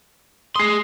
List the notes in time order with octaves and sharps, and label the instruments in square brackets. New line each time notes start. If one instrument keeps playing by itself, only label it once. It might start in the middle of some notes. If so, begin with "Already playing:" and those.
[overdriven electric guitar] G#4 C6 [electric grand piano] D#6 C7